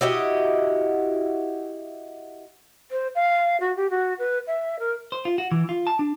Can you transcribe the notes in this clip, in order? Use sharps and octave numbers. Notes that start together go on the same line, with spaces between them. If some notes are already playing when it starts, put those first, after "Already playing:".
E4 F#4 G4 D#5
C5
F5
F#4
G4
F#4
B4
E5
A#4
C5
F4
F#4
E3
F4
A5
D4